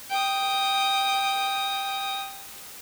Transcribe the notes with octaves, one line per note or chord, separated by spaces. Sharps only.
G5 D#6